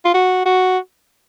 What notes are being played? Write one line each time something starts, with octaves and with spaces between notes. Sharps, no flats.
F4
F#4
F#4